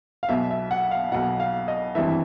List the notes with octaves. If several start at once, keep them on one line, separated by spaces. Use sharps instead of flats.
F5
B1 B2 E5
E5
F#5
F5
B1 B2 F#5
F5
D#5
G#1 G2 E3 E5